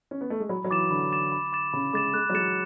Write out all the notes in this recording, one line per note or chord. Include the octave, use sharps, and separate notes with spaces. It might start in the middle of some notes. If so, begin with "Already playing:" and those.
C#4
B3
A3
G#3
F#3 B5
F#3
E3 D6 A6 E7
D3 B5
D6 A6 E7
B5
D6 A6 E7
C#3 B5
G#3 D6 A6 E7
G#3 F#6
F#3
G#3 A6 C#7 E7